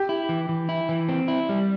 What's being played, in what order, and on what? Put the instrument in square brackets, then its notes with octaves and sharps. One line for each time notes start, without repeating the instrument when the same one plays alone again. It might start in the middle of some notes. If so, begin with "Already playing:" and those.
Already playing: [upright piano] G4
[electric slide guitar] E4
E3
E3
E4
E3
C4
E4
G3